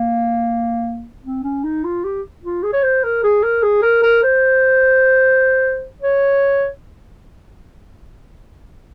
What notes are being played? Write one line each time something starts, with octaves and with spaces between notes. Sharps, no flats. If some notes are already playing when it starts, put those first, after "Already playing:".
Already playing: A#3
C4
C#4
D#4
F4
G4
F4
G#4
C#5
C5
A#4
G#4
A#4
G#4
A#4
A#4
C5
C#5